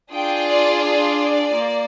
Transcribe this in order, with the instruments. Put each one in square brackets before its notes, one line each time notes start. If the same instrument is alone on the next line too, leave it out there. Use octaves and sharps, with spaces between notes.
[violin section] D4 F4 G#4 G5
D5
D5
A#3